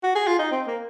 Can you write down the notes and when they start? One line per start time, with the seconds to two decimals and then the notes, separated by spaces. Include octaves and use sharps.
0.03 F#4
0.15 G#4
0.27 F4
0.39 D#4
0.51 C4
0.67 A#3